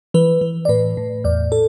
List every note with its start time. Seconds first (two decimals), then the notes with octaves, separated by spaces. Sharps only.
0.14 E3 B4
0.41 E3
0.65 D5
0.69 A2 B4
0.97 A2
1.24 E2 D5
1.52 A4